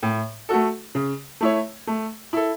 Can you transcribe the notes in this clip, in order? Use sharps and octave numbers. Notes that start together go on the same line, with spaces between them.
A2
A3 F#4 A4
C#3
A3 E4 C#5
A3
E4 A4